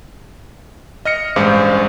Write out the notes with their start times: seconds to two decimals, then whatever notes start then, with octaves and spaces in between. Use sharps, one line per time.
1.05 D#5 F6 A#6 C#7
1.36 A1 G2 G#3 C5 F5 D6